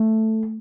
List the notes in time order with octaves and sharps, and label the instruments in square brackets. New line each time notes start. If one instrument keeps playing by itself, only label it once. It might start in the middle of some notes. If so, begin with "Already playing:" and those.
Already playing: [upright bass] A3